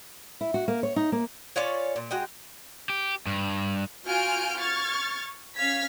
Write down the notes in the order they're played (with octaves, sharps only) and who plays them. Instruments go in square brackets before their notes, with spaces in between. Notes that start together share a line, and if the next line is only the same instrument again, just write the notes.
[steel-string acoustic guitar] E4
F#4
A#3
C#5
D#4
A#3
[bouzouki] C#4 F4 C#5 D5
A#2
G#3 F#4 D#5 G5
[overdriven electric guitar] G4
G2
[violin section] F4 F#4 G#5 F6 G6 D7
C#6 F6 G#6 A6
C#4 F5 F6 G#6 B6